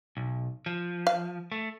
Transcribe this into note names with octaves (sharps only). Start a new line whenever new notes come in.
B1
F3
F5
A3